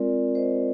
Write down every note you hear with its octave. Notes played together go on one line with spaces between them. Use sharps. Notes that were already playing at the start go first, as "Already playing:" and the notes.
Already playing: G#3 C4 F4 A#4 D5
C5 D#5